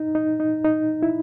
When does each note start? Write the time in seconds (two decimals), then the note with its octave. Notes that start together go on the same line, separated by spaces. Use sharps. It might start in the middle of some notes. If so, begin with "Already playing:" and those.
Already playing: D#4
0.15 D#4
0.40 D#4
0.64 D#4
1.03 E4